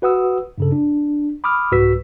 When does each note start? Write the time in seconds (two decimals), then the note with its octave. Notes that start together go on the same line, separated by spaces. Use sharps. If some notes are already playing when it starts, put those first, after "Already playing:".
0.02 F#4 B4 F#5 D#6 E6
0.58 G2 C#3 A4
0.72 D4
1.44 B5 D6 D#6 F6
1.72 C2 G#2 F#4 B4 E6 B6